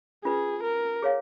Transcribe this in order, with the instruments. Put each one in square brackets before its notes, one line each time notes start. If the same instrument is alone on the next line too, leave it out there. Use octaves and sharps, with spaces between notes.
[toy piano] C#4 F4 B4 [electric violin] G#4
[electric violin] A#4
[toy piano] G#4 C#5 F5